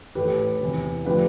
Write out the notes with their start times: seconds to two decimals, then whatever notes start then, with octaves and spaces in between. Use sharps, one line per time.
0.15 A2 E3 A3 G4 B4
0.61 E2 C3 E3
1.05 D3 F3 A3 G4 B4